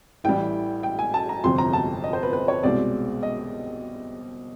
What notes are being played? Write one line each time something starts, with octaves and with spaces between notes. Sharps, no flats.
A1 A2 E3 G3 G5
G5
G#5
A5
A#5
G1 F2 C3 C6
A#5
A5
D#5
C5
B4
B4
C#5
C2 B2 G#3 C4 D5
D#5